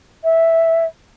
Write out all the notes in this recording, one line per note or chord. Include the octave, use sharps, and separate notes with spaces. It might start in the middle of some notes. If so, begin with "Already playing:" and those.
E5